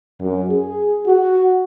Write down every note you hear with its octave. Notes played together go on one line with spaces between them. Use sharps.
F#2
G#4
F#4